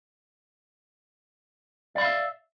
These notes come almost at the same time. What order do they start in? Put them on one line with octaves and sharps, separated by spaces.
D5 B5 F5 E5